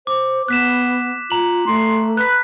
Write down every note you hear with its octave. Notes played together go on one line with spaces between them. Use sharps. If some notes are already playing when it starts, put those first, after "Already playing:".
C5 D6
B3 F#6 B6 E7
F4 A#5 F#7
A3 C6
B4 F#6 B6